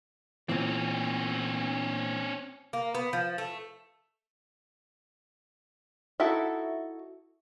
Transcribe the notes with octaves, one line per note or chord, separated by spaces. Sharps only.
A#2 E3 C4 C#4
A#3
B3
F3
A3
D#4 E4 F#4 A4 E5